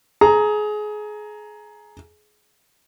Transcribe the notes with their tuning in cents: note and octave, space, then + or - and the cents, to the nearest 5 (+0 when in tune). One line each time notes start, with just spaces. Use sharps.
G#4 +25 A#5 +0